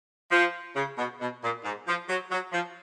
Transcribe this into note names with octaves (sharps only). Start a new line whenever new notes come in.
F3
C#3
B2
B2
A#2
G#2
F3
F#3
F#3
F3